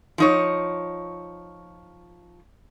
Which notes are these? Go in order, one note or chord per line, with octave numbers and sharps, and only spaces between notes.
F3 D#4 C#5